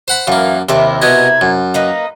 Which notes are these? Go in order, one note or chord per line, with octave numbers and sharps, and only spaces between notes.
C5 F#5 B5
F#2 E3 A#3 F5
D#2 C3 E4 A#4
B2 B3 D#5 G#6
F#2
A#3 D#4 B4 D#5